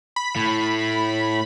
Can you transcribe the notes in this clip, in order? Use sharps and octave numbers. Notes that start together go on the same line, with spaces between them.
B5
A2